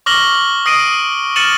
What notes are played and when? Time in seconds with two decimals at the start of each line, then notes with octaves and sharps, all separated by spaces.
0.06 C#6 D6 F6 A#6 F#7 G7
0.66 D#6 A#6 C7 D7 D#7
1.36 F6 A6 C#7 D#7 E7 F#7